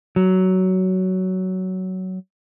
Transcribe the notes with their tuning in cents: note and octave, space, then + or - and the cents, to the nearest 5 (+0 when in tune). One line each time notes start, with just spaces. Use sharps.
F#3 +15